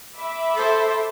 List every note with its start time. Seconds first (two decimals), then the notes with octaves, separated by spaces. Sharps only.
0.17 E5 B5 D6
0.55 A4 C5